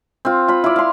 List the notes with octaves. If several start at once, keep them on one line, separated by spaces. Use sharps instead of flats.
C4 F4
F4 B5
E4 D5
F5 C6